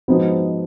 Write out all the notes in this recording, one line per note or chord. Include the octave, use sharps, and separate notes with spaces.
G#2 F3 B3 D#4 F#4